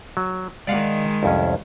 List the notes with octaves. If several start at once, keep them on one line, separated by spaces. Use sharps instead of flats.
F#3
D#3 G#3 D5 F5 F#5
C2 F2 C#4